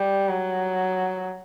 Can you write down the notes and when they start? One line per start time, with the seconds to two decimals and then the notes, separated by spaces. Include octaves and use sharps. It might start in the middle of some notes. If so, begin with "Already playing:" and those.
Already playing: G3
0.28 F#3